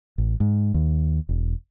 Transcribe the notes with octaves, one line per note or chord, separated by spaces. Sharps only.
A1
G#2
D#2
E1